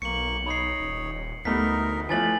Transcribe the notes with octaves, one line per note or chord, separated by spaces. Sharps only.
B1 A#3 C#6 C#7 F#7
D#4 C#5 B5 C7
D#1
D2 G3 A3 B3 D#4 A#4 B6
E3 F3 A3 B4 G#5 A6 F#7